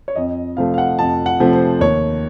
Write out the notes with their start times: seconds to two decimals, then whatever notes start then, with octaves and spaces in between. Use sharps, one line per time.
0.08 C#5
0.16 F2 D#5
0.57 C3 F3 A3 F5
0.74 F5
0.78 F#5
0.99 F2 A5
1.26 F#5
1.40 C3 F3 A3
1.53 C5
1.80 D#2 C#5